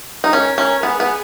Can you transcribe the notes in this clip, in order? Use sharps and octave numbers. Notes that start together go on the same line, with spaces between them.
D#4
C#4 A#4
C#4
B3 G#4
B3